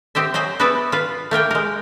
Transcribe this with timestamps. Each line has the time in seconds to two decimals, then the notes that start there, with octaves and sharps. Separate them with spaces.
0.15 C4 G4 D#5 E5
0.34 F#3 C5 D#5 G#5
0.60 B3 F#4 G#4 B4 D5 E5
0.92 F4 B4
1.31 A3 A#3 A#4 G5
1.51 G#3 A#4